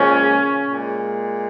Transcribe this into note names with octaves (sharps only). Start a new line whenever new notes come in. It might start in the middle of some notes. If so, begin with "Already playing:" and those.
Already playing: A#2 C#3 F3 G#3 C#4
A#2 G#3